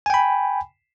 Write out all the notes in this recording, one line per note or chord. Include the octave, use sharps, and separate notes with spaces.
G5 G#5 B5